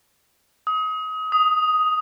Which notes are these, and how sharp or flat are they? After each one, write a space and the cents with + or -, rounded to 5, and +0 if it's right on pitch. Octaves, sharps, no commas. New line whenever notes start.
D#6 +30
D#6 +5